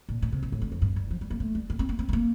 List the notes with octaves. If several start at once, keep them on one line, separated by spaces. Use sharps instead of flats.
A#2
A#2
C3
A#2
A2
G2
F2
G2
G2
F3
G3
A#3
A3
G3
A#3
C4
A#3
C4
A3
A#3